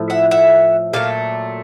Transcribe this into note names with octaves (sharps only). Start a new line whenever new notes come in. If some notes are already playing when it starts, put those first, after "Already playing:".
Already playing: A2 F3 A3
E5 F#5
E5 F#5
A#2 F#3 A3 F5